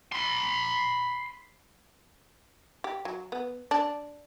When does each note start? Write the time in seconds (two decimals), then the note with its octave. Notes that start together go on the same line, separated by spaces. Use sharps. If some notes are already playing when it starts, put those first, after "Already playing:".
0.12 B5 C6
2.84 G4
3.05 F#3
3.32 B3
3.71 D4